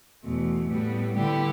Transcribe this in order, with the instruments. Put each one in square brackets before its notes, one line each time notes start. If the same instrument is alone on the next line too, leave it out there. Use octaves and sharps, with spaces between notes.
[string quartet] E2 B2 A3
A2 G3 B3
D3 G3 B3 E4 G4